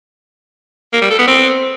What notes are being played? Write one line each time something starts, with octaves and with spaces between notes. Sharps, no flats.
A#3
G3
A4
B3
C4